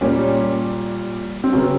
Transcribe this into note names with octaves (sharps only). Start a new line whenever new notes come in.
A#2 G3 A#3 C#4
C4
C#3 F#3 B3 C#4